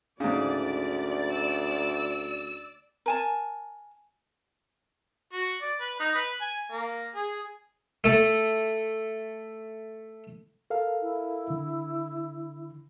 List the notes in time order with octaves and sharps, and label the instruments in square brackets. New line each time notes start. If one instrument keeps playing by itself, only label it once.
[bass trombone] D2 [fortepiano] G#2 C#3 [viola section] D5
[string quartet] E6
[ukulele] A#4 G#5 A5
[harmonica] F#4
D5
B4
D#4
B4
G#5
A#3
G#4
[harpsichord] A3 A4
[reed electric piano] A4 A#4 F5
[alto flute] E4
[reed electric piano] D3